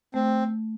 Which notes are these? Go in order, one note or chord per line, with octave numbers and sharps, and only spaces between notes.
A3 C4